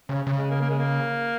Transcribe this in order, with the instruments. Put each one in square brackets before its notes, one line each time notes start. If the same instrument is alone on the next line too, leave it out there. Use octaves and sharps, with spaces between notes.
[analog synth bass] C#3 [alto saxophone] C#4
[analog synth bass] C#3
[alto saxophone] G#3
A#3
A#3
G#3
A#3